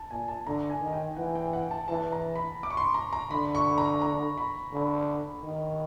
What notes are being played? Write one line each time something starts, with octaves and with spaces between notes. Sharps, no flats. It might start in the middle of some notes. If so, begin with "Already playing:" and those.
Already playing: A5
A#2 G#5
A5
D3 A#5
G#5
D#3
G5
E3 F#5
G5
F#5
A5
E3 A5
A#5
B5
D6
C#6
C6
A#5
A#5
D3 B5
C#6
A#5
A#5
B5
D3
D#3